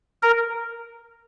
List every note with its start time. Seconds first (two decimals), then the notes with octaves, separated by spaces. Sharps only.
0.23 A#4